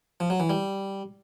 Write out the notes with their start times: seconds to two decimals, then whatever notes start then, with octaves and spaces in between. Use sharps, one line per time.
0.20 F3
0.30 F#3
0.40 E3
0.50 G3